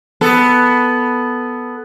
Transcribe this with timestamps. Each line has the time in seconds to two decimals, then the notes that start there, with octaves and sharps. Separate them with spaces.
0.21 B3 A4